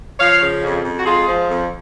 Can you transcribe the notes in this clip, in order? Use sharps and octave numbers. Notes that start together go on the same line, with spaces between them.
F3 C#5 F5
C#3
F2
F2
F#4
G#3 F4 G#4
F3
F2